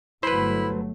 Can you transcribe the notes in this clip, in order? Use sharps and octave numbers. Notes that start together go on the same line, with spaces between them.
G1 F#3 A3 E4 B4 C5